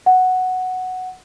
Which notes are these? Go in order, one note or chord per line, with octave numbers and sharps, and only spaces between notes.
F#5